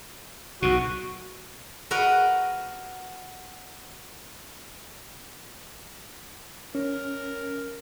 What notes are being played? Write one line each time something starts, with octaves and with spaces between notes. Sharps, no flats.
B1 B2 F#4
F#4 A#4 B4 D#5
C#4 A#4